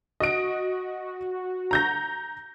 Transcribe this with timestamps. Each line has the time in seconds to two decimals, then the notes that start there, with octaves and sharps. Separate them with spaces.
0.20 F#4 D#5 D7
1.71 A#5 G6 A#6